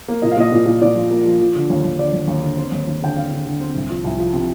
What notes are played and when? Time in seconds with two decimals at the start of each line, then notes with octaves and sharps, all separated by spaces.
0.08 A#3
0.22 A#2 D#5
0.31 F5
0.37 A#2 D#5
0.52 A#2
0.66 A#2
0.82 A#2 D5
0.95 F3
1.10 A#3
1.25 F3
1.41 F3
1.55 D3
1.70 D#2
1.84 D#2
1.98 D3 D5
2.13 D#2
2.27 D#2
2.43 D3
2.57 C4
2.72 D#2
2.87 D#2
3.02 D3 G5
3.16 C4 F5
3.31 D3
3.46 D3
3.60 C4
3.75 C2
3.90 F3
4.04 C2
4.18 F3
4.33 C3